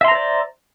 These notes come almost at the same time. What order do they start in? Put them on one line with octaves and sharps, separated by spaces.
E5 C6 A#5 C5 D5